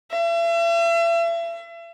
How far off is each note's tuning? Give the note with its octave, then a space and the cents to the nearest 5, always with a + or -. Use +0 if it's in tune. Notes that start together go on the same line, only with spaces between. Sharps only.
E5 +40